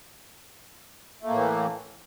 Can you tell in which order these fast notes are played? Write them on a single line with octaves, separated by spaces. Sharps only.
A3 A#3 A2 E3